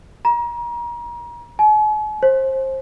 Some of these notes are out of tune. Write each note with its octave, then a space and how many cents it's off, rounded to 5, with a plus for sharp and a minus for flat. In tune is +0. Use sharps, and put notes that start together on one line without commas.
A#5 +35
G#5 +45
C5 +25